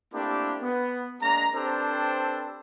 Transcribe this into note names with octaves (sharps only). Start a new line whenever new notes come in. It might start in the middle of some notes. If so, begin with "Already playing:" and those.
A3 A#3 C4 D4 E4 G4
B3
G#3 A#3 D4 A#5
C4 D4 G4 A4 B4 C5